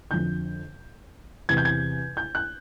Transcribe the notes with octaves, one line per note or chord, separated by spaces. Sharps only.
F2 D3 G6
E2 C3 E3 G#6
G6
G#6
G6
F#6